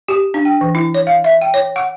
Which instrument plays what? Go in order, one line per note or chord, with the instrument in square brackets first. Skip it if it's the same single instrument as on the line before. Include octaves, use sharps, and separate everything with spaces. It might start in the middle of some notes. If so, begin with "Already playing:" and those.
[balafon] G4
D4
G5
E3
E4
C#5
F5
E5
G5
C#5
F#5